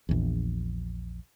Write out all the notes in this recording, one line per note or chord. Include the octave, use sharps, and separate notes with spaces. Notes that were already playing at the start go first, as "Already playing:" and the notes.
A#1 E2